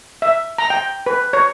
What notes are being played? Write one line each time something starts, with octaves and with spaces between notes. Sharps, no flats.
E5
A#5
G5
B4
C#5